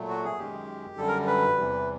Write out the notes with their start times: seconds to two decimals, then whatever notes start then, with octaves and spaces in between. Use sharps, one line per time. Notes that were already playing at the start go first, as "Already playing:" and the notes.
Already playing: A#2 F#3 A3
0.09 F#4
0.24 G#4
0.39 F#2 D#3 G#3 G4
0.97 F#2 D3 G3 A4
1.08 A#4
1.27 B4
1.56 E2 C3 E3 G3